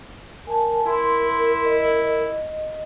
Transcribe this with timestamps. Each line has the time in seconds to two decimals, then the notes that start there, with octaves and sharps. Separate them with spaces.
0.47 A#4 G#5 A5
0.87 E4 A#4 C6
1.65 D#5